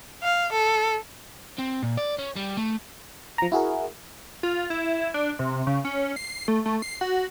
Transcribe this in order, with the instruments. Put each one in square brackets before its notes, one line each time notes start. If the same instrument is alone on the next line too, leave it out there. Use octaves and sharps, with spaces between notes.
[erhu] F5
A4
[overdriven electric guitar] C4
A#2
D5
C#4
G3
A3
[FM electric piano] F3 A#5
E4 F#4 G#4 A#4
[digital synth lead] F4
E4
D4
C3
C#3
C#4
C7
A3
A3
C7
F#4